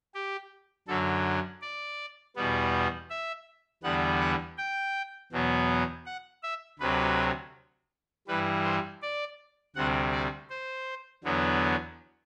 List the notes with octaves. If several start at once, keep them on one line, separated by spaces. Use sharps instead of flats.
G4
F#2 D3 F#3 A4
D5
E2 B2 G3 B3
E5
E2 D3 G3 B3 F#5
F#5
G5
E2 B2 F#3 B3
F#5
E5
D2 C3 F#3 B4
G2 E3 G3 B4
C5
D5
D2 C3 G3 F#5
D5
C5
E2 D3 F#3 B3